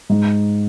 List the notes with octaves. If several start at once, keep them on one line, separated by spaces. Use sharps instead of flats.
G#2